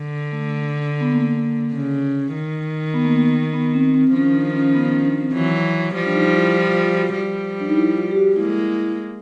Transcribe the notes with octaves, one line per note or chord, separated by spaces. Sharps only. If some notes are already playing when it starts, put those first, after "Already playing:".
Already playing: D3
A3
B3
A#3
C#3
D#3
B3
A#3
B3
B3
C4
C4
D#3 F3 C#4
D4
C#4
B3
C#4
D4
C4
E3 F#3
F3 G3
D4
D#4
E4
F4
F4
F#4
F3 G3
D4
D#4
E4
F4
G4
F#4
G#3 A#3 E4